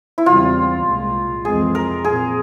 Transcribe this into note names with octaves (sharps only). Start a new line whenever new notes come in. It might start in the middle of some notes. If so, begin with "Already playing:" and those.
E4
E2 C#3 G3 C4 F4
C2 A#2 G#3
F2 E3 G#3 C4 G#4
A#4
A#2 F3 C4 G#4